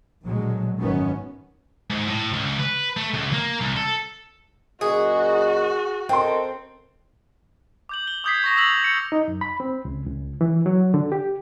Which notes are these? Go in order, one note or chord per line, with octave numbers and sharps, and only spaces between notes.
A#1 B2 D3 F#3 G#3
G#1 F#2 D#3 B3 C#4
G#2
A2
C#2
B4
A3
C#2
A#3
C2
A4
F#2 A#2 F#4 G#4 D#5
C4 A4 A#4 D#5 G5 C6
D6 G6 F#7
G7
D6 D#6 G6 G#6 B6 C7
C#6 A#6 F7
E6 A#6 B6 F7 F#7
C#7
D#4
F#2
B5
C4
C#2
C#2
E3
F#3
D3
G4